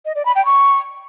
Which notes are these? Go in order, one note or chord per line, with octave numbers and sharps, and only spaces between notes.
D#5
D5
B5
G5
C#6